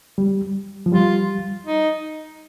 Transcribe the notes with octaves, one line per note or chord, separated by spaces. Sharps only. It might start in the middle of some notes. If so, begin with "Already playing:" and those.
G3
F3
G3 F4
D#4